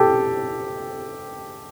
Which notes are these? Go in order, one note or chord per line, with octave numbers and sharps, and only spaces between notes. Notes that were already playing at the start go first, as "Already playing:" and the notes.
Already playing: G4 A4